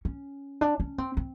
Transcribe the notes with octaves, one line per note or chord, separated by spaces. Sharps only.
C#4
D4
C#4
C4
C4